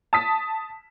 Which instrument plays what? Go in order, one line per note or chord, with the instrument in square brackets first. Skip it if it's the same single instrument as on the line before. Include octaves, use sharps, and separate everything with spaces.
[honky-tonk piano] A5 D#6 B6